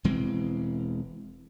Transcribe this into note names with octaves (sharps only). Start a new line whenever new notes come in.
E1 E3 G#3 C4